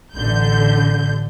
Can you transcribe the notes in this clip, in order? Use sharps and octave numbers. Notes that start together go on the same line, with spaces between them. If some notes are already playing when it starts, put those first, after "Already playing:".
A1 D3 G6